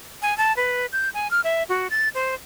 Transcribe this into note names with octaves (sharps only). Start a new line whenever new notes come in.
G#5
A5
B4
G6
G#5
F6
E5
F#4
A6
C5